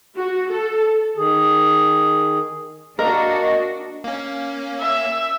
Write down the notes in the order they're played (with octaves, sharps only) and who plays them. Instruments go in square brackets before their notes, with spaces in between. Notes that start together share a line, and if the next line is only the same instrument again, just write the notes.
[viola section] F#4
A4
[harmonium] D#3 G#4
[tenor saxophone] A#3 [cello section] D4 F#4 [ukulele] A#4 [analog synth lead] D#5
[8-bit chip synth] A#3 C#4
[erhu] E5